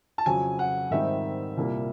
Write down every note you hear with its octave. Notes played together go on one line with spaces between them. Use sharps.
A5
F2 C#3 F#3 G#5
F#5
G#2 D#3 G3 C4 D#4 E5
C2 A#2 G3 A#3